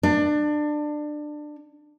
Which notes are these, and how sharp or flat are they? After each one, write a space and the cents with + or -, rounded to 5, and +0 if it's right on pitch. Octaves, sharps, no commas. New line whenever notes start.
D4 +25